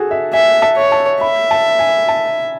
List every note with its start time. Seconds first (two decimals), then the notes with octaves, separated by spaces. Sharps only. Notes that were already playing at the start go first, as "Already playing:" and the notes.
Already playing: F#4 G#4 A4
0.11 E5
0.33 E5 G#5
0.62 A5
0.77 C#5
0.92 A5
1.21 E5 B5
1.51 A5
1.79 G#5
2.08 A5